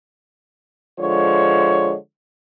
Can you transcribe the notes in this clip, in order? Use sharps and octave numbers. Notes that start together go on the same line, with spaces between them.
D3 F3 G#3 C#5